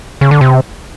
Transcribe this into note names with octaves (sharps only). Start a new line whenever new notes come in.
C#3
D3
C3